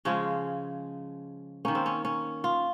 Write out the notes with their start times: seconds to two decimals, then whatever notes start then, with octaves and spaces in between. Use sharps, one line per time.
0.05 C#3 F3 G#3 C#4
1.65 D#3 A#3 C#4
1.75 C4
1.86 C#4
2.05 C#4
2.44 F4